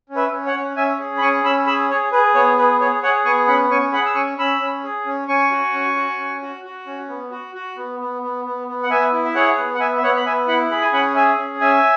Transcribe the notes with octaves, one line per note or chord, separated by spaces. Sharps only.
C#4
B4 E5
C#4
C#5 F#5
C#4
C#4 E5 G#5
G#4
B5
C#4 G#5 C#6
C#4 B5 E6
G#4 B5 E6
G#4 C#5
G#4 B4
B3 C#5
G#4 B4
G#4 C#5
G#4 C#5 F#5
B3 G#5 C#6
C#4 F#5 B5
C#4 G#5 C#6
G#4 F#5 B5
E6
C#4 G#5 C#6
C#4 B5 E6
C#4
G#4
C#4
C#4 G#5 C#6
F#4
C#4
F#4
C#4
F#4
F#4
C#4
B3
F#4
F#4
B3
B3
B3
B3
B3
F#5
B3 E5 G#5
E4
E5
G#4 C#5 F#5
B3
F#5
B3 E5 G#5
E5
B3 C#5 F#5
B5
B3 E5 G#5
E4 F#5 B5
G#4 B5
G#5
C#4 F#5 B5
G#4 E5 G#5
C#4
C#4 E5 G#5